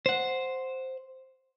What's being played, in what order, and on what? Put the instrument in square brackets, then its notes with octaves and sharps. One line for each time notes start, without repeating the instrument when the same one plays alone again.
[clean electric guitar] C5 F#5